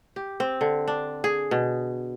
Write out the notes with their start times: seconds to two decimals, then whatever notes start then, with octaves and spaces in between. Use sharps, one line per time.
0.16 G4
0.40 C4
0.61 D3
0.88 D4
1.24 G#4
1.51 B2